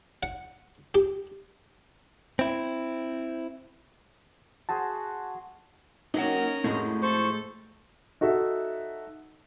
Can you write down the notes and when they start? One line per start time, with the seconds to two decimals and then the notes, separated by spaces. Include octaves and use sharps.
0.23 F#5
0.94 G4
2.39 C4 E4
4.69 F#4 G#4 C5 A5
6.14 F#3 A#3 C#4 D#4 F#4 A#4
6.64 F2 A2 G#3 A3 F#4
7.02 A4 C5 C#6
8.21 D#4 F#4 A4 E5